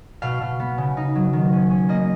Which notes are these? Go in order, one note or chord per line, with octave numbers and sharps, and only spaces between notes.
B2 F5
B2
B3
C#3
D#4
F#3
D#3
C#4
C#4
A#3 D#5